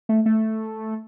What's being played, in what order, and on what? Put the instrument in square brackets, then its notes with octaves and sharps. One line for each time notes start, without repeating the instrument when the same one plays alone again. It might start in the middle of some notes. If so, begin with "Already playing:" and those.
[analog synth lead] A3
A3